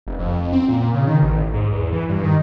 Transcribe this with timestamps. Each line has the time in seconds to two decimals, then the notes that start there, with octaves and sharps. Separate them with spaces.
0.07 F1
0.19 F2
0.53 C4
0.68 A#2
0.94 C#3
1.07 D#3
1.22 A1
1.54 G#2
1.72 E2
1.92 E3
2.09 G2
2.24 D#3